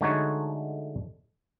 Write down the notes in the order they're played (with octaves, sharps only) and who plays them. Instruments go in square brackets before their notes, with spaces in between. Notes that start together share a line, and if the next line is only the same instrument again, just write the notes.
[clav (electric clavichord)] D3 G#3 A3 D#4 F#4 C#5